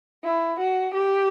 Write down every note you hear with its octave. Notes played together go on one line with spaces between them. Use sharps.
E4
F#4
G4